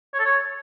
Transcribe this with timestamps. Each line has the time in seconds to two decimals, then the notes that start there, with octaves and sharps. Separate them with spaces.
0.13 C#5
0.19 A4
0.25 C#5